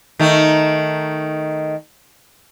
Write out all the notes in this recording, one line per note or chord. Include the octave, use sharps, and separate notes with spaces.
D#3 A3